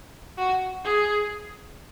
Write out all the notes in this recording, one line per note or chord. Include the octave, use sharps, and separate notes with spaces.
F#4
G#4